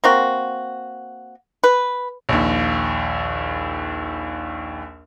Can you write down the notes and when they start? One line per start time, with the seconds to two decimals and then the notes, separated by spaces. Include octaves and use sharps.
0.04 A#3 C4 F#4
1.64 B4
2.29 A#1 D#2